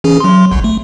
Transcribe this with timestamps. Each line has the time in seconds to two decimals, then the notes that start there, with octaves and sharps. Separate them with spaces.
0.04 E3 C#4 G#4
0.20 F#3 C6
0.51 G1 C2
0.64 A3